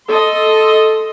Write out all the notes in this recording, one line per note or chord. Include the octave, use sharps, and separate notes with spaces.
A4 D#5 C6